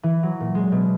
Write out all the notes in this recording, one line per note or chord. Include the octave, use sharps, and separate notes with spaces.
E3
F#3
A#2
G#3
B2